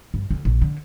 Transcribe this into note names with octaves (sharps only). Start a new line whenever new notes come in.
G2
D2
A#1
D3